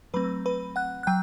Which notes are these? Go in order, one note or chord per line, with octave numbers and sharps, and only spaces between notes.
F#3 A3 C4 B4 B5
B4 B5
F#5 F#6
F#6
F#3 G5 G6